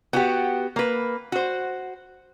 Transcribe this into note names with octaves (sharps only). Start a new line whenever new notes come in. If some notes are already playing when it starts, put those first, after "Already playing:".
B3 F#4 G4
A#3 B4
F#4 C5